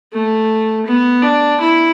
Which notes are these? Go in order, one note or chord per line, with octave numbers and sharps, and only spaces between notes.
A3
B3
D4
E4